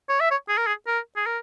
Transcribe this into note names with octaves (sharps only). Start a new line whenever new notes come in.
C#5
E5
C#5
G#4
A#4
G#4
A#4
G#4
A#4